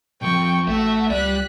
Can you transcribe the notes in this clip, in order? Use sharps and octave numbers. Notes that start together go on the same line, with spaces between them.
B1 F2 G5 C#6
A1 A3 F#4 E5
C#2 G3 D5 F#6 B6